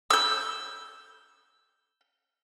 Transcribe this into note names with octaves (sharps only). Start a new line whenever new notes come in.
E6 G6